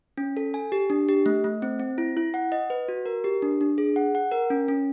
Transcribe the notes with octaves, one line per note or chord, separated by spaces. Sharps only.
C#4
A4
G#5
G4
D4
G4
A3
A3
C4
C4
E4
E4
F#5
D#5
B4
F#4
A#4
G4
D4
D4
G#4
F#5
F#5
A#4
C#4
C#4